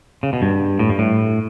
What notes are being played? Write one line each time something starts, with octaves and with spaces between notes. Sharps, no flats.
C#3
B2
G2
A2
G2
A2